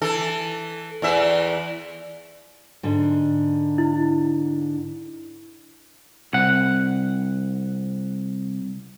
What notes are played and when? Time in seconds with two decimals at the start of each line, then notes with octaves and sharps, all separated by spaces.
0.02 E3 A4
1.02 E2 E3 E5
2.83 G#2 D3
3.78 E4
6.33 C2 F#5